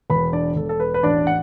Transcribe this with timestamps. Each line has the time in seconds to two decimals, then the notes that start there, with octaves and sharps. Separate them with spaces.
0.10 E1 B4 B5
0.33 D4 D5
0.56 E1 A4
0.69 A4
0.80 B4
0.94 B4
1.03 A1 D4 D5
1.27 F#5